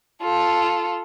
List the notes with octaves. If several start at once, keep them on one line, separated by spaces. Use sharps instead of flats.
F4 A4